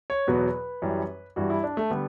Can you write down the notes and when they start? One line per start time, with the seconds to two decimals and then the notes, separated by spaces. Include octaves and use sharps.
0.10 C#5
0.27 E2 B2 F#3 B4
0.82 F#2 E3 G3
1.36 G2 E3 G3 F#4
1.50 E4
1.63 D4
1.77 A3
1.90 D3 G3 B3